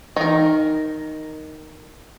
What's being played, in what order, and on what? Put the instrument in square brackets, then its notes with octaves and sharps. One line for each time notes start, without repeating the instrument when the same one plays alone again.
[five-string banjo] D#3 A#4 [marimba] E3 D#4